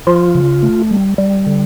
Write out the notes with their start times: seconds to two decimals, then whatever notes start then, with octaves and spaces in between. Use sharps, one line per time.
0.07 F3 F4
0.35 C#3
0.63 A3
0.91 G3
1.18 G3
1.46 D3